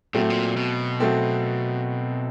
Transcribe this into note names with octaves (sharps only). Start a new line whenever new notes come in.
A#2 F#3 A3 C4
A2
A#2
B2
F#3 A3 C4